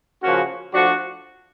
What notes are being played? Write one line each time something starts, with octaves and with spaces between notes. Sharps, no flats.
C#3 F3 A#3 C#4 F#4
F3 A3 D4 F#4